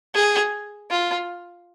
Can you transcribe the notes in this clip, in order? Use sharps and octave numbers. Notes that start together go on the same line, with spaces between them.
G#4
F4